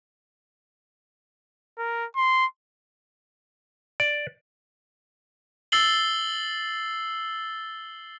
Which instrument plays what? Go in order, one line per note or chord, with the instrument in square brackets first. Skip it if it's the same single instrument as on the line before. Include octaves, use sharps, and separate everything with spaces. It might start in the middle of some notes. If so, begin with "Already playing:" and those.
[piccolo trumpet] A#4
C6
[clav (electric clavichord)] D5
[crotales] E6 A6 C7 F#7 G7